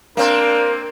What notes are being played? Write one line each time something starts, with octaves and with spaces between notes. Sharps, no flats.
A#3 C4 D4 A#4 F5